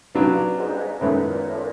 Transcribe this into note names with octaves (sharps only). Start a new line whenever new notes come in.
G2 C#3 F#3 B3 D4
G#2
G2
G#2
F#2 A2 D#3 G#3 B3
A#2
A2
A#2